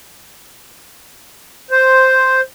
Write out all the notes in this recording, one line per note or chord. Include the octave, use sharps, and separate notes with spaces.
C5